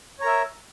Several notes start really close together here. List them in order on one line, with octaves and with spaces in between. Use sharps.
C#5 A#5 A#4 E5